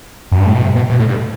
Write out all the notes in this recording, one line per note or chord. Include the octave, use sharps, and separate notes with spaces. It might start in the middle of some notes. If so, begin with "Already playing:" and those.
F#2
G2
A2
B2
C3
B2
B2
A2
G2